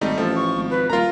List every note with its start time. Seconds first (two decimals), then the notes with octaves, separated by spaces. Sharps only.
0.01 G#1 G3 A3 D#4
0.18 A1 F3 A4
0.36 C#6
0.56 G#1
0.70 B4
0.90 D#1 F4 A#4 A#5